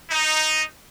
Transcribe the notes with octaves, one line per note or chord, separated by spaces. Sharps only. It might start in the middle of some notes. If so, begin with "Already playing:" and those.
D#4